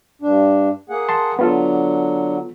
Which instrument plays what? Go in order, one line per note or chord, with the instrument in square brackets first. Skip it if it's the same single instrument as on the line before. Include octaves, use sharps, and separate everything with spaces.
[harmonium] G2 D4
A#3 G#4 F#5
[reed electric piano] A5 C6
[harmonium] D3 F#3 [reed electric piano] B3 F4 A4